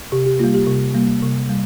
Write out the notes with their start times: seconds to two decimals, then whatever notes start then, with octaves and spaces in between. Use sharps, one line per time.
0.12 C3 G4
0.26 G4
0.39 A#3 F4
0.44 G3
0.54 G4
0.67 C3
0.95 G3 A#3
1.22 C3
1.49 G3